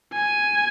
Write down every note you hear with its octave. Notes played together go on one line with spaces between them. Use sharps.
G#5